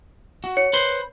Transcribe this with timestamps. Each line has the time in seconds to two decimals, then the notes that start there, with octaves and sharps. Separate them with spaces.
0.44 F#4
0.57 C#5 C#7
0.73 B4 C5 C6